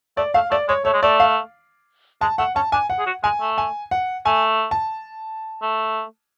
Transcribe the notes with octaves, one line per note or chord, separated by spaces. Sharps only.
A3 D5
A3 F5
A3 D5
G#3 C#5
A3 C#5
G#3
A3 D5
F5
G#3 A5
A3 F#5
C#4 A5
D4 G#5
F#5
G#4
F#4
G#3 G#5
A3
G#5
F#5
A3 G#5
A5
A3